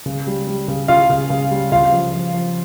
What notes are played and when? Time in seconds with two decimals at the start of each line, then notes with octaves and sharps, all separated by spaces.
0.06 C#3
0.27 G3
0.47 G3
0.68 C#3
0.88 C#3 F4 F5
1.10 C#3
1.30 C#3
1.51 G3
1.72 C#3 F4 F5
1.92 F3
2.13 F3
2.34 F3